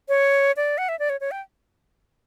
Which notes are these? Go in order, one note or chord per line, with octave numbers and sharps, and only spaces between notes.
C#5
D5
F#5
E5
D5
C#5
C#5
G5